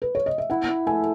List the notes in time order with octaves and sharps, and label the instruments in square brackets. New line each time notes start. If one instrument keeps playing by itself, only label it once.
[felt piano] B4
C#5
D#5
E5
[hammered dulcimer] E4 [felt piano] F#5
[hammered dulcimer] E4
[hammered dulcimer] A3 [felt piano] G#5